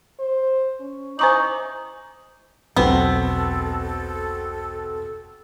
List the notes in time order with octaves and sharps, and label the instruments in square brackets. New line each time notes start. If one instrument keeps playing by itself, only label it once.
[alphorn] C5
C#4
[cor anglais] D#4 [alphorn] E4 [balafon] C5 A#5 D6 [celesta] G#5 C#6 F#7
[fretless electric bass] E1 B1 F#3 [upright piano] B2 C4 [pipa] B3 [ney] A4